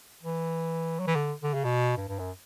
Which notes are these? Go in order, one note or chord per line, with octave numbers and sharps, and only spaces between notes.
E3
F#3
E3
D3
D3
C#3
B2
G2
G2
F#2